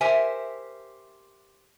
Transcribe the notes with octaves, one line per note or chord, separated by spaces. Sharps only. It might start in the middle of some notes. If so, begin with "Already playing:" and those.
G4 A#4 C5 E5 G#5